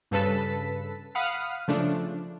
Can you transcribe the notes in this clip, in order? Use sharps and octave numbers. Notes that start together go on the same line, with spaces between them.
G2 C#3 A4 B4 A5 B6
F5 F#5 B5 D#6 F6
C#3 F3 A3 D4